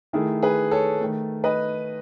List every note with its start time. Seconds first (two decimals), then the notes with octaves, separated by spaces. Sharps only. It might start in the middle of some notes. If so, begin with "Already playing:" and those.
0.13 D#3 A3 E4 G#4
0.42 G#4 B4
0.71 A4 C#5
1.00 D#3 A3
1.44 B4 D#5